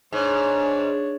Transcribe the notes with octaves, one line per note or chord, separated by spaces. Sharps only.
G#2 D4 C#5